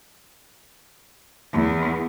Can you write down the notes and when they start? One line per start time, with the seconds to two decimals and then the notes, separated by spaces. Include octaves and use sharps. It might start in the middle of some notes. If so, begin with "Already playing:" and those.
1.53 E2